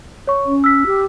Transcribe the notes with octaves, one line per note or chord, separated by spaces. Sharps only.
C#5 C#6
C#4
E6 F6 B6
G4